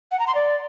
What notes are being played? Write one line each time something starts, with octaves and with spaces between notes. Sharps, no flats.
F#5
A#5
C6
D5